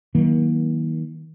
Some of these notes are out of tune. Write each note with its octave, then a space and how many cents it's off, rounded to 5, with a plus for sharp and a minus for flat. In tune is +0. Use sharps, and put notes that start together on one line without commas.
D#3 +35 F#3 +25 A#3 +30